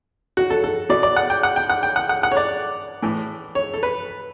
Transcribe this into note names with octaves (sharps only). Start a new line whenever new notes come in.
F#4
A4
A4
B2 D5
D5
F#5
G5
F#5
G5
F#5
G5
F#5
F#5
F#5
C#5
D5
A2 E3
C#5
A4
B4